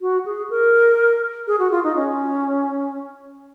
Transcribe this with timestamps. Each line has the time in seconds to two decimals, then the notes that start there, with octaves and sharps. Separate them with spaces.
0.01 F#4
0.26 G#4
0.50 A#4
1.47 G#4
1.59 F#4
1.71 F4
1.84 D#4
1.96 C#4